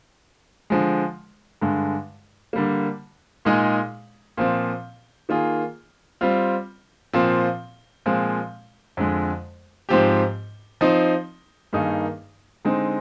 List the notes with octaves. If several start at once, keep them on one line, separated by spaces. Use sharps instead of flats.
D3 F3 G#3
G2 D3 G#3
D3 G3 A#3
A#2 G#3 D#4 G#4
A#2 F3 C4
D#3 A#3 F4 G#4
G3 C4 F4
A#2 F3 C4
A#2 F3 G#3 C4
F2 D3 G#3
G#2 F3 C4 G4
F3 C4 D#4
G2 D#3 A#3 D#4 G#4
D3 G#3 C4 D#4